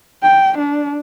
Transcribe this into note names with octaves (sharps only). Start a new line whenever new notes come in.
G5
D4